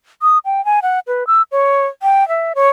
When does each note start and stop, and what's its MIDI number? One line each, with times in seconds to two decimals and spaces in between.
0.22 0.38 87
0.45 0.64 79
0.65 0.80 80
0.82 1.00 78
1.07 1.26 71
1.27 1.42 88
1.52 1.87 73
2.03 2.27 79
2.28 2.53 76
2.55 2.69 73